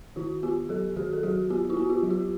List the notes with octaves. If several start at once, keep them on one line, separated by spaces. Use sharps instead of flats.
D#3 E4 F#4
B3 F4 G4
F#3 G4 A4
D#3 F#4 G#4
A4
F#3 F#4 G#4
B3 F4 G4
E4 F#4
B3
F4 G4
F#3
F4 G4